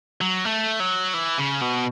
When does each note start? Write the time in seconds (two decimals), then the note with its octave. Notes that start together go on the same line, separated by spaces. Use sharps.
0.21 F#3
0.45 A3
0.80 F#3
1.14 E3
1.39 C#3
1.62 B2